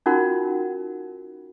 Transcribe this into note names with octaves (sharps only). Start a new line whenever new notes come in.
C#4 D#4 F4 F#4 A#4 F#5